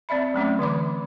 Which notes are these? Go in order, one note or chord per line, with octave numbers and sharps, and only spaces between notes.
C4 D5 E5 B5
F#3 A3 C#4 D6
D3 E3 B5 D6